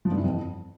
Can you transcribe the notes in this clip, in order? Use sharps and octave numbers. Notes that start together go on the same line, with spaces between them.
F3
G2
E3
F2